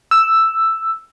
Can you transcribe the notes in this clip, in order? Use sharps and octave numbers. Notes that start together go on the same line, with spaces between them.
E6